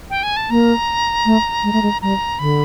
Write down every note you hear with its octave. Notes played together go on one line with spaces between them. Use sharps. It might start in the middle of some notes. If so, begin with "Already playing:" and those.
G5
G#5
A5
A#3 A#5
A3
G#3
A3
G#3
G3 A#5
D3 B5